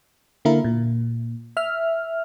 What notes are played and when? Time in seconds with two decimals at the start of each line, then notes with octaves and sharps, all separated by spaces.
0.45 D3 A#3 E4 A#4
0.64 A#2
1.57 E5 F6